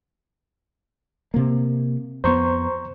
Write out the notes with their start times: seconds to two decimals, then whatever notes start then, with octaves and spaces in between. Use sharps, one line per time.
1.34 C3 A#3
2.24 F2 B3 C5 A#5 C#6